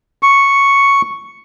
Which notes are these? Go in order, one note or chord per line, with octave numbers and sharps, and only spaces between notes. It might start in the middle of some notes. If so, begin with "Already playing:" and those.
C#6